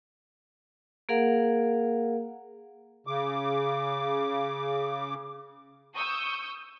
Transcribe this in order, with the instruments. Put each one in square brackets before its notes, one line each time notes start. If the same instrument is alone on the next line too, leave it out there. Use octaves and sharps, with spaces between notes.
[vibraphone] A#3 G#4 A#4 F5 F#5
[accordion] C#3 D6
[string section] C#6 D#6 E6 G6